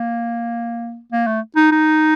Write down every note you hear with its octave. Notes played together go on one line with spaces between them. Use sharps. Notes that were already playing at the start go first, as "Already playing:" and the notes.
Already playing: A#3
A#3
A3
D#4
D#4